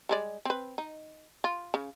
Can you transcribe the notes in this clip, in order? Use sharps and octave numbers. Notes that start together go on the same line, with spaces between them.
G3 G#3 D5
C4 B4
D#4
F4
C#3